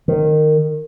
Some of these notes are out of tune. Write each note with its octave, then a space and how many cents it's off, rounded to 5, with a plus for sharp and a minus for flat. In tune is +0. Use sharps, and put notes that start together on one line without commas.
D#3 -20